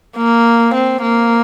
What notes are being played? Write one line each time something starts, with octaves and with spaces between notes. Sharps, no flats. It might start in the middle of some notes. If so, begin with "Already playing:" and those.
A#3
C4
A#3